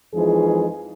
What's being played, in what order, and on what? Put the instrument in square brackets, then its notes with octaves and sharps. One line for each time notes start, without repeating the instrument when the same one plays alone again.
[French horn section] F2 E3 F3 G#3 D#4 G#4